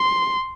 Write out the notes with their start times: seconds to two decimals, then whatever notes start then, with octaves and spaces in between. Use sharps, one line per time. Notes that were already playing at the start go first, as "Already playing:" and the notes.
Already playing: C6